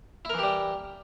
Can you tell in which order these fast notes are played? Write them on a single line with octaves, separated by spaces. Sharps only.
E4 A#4 E3 G4 G3